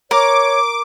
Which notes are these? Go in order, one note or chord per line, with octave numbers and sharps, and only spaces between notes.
A#4 C#5 D6